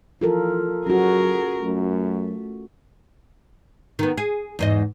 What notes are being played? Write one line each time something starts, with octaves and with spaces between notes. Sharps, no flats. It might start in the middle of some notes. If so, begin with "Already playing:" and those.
E3 F3 F4 A4 A#4
F#3 C#4 F#4 G#4 A#4
F#2 A3
D#3 B3
G#4
E2 G#2 D#5